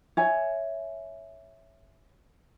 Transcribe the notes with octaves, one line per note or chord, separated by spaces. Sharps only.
C#5 E5 G#5